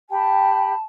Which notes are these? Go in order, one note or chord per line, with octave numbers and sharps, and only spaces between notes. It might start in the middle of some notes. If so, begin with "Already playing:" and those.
G4 G5 A5 B5